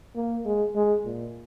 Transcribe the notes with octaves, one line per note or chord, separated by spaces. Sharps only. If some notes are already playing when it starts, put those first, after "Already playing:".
A#3
G#3
G#3
A#2